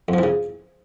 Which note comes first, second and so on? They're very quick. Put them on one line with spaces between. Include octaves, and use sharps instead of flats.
F2 F3 E3 C#3